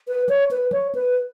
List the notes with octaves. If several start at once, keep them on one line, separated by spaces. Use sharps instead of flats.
B4
C#5
B4
C#5
B4